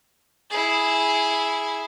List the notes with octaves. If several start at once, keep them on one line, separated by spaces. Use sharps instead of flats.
E4 G#4